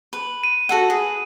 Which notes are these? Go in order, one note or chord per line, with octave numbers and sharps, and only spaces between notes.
B4
D#7
F#4 A4 F#5
G#4 B4